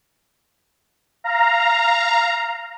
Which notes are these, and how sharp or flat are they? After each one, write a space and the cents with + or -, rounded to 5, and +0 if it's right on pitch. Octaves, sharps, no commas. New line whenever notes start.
F5 -10 A#5 +0